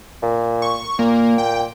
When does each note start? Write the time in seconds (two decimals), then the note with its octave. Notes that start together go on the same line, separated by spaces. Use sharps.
0.22 A#2
0.62 C#6
0.99 A#2 A#3
1.38 G5